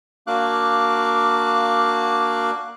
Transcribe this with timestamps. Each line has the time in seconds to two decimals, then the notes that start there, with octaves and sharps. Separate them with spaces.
0.27 A#3 D4 F#4 F5 D6 F#6